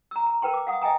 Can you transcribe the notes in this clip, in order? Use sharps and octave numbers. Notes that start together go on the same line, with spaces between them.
A#5 E6
A#5
A#4 B4 G5 C6
D6
F5 F#5 D#6
D#5 E5 G5 G#5 A#5 D#6